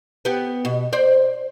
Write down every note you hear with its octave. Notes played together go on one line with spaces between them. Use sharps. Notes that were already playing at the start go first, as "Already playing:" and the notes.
B3 G4
B2
C5 D5